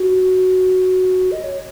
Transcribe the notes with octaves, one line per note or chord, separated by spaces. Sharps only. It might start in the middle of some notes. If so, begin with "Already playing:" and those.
Already playing: F#4
D#5
C#5